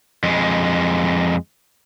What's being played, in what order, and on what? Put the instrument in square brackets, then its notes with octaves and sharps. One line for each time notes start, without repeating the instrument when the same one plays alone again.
[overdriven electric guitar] F2 G#3